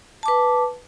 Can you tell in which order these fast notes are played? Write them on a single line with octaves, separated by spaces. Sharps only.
A5 D6 B4